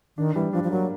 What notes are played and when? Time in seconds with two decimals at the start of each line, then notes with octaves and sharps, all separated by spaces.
0.17 D#3 D4
0.35 E3 G3
0.53 F3 D4
0.64 F3
0.71 F#3 A#3